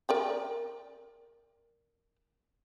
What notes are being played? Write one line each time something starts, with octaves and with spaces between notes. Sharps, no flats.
A#4 D5 G5